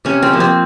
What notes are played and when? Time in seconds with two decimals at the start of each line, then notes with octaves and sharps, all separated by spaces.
0.05 C3 C#4
0.22 C4
0.32 F3 A#3
0.40 C4